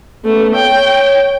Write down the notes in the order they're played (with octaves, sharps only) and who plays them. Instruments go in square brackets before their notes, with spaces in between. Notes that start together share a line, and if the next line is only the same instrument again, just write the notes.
[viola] A3 [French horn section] B3 C#4 B4
[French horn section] C#5 [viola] G5